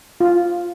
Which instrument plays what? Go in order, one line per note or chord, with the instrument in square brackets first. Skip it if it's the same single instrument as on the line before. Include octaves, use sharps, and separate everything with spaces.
[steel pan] F4